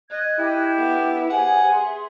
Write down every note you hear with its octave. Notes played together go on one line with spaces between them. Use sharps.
D#5 F#6 G#6
E4 G4
B3 D4 A4
G4 G#4 C5 E5 F#5 G#5
E5 C6